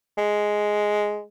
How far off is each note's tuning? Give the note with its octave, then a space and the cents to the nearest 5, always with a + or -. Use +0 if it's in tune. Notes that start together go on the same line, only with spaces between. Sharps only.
G#3 +5